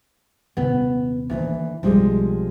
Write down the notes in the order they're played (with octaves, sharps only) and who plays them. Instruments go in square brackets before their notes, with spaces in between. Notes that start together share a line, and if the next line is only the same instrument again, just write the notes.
[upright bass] D#1 C3 [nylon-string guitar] B3
[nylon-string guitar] D2 E3 [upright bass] D#3 A#3
[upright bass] B1 C4 [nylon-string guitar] F3 G3 G#3